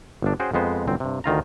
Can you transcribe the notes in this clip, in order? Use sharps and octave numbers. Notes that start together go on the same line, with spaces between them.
G1 D4
C#4 F#4 G#4 C5 G5
F2 G#3 B3 C5
G1 C2 F#2 C4
G2 C3
D2 D#3 F4 A#5